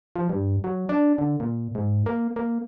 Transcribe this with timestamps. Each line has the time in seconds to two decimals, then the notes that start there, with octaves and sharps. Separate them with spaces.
0.16 F3
0.29 G2
0.64 F#3
0.89 D4
1.18 D3
1.40 A#2
1.75 G#2
2.06 A#3
2.36 A#3